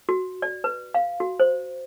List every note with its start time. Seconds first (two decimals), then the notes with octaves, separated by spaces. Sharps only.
0.09 F#4
0.42 D5
0.64 B4
0.94 F5
1.20 F#4
1.40 C5